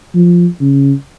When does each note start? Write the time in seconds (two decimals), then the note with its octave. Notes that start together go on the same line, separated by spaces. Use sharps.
0.15 F3
0.61 C#3